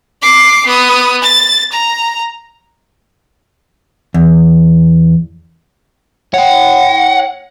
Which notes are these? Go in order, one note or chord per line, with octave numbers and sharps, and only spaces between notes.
D6 C7
B3 D#6
A6
A#5
E2
C#5 F#5 G5